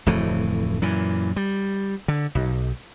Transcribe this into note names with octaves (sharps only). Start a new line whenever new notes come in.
D1 F2 E3 A3
F#2 A#2 E3
G3
D3
B1